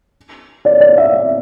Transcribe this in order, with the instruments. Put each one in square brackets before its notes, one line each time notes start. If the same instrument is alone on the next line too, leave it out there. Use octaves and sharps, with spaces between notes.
[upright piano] D5
D5
E5